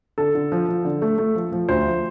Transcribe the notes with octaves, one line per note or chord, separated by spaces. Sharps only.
D3 A4
D3
F3
F3
D3
A3
A3
F3
F3
D2 C5
F3